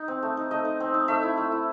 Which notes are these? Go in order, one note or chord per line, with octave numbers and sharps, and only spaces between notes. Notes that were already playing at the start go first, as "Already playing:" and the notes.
Already playing: D#4
C4
A3
D#4
A3 D#5
D#4
C4
D#4
A3 E5
E4
A3
E4